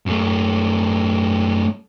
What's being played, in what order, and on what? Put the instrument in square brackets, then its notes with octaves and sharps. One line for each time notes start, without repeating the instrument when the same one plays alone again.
[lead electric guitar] F#2 A3